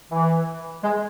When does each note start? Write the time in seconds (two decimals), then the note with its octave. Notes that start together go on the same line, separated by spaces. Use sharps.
0.11 E3
0.84 G#3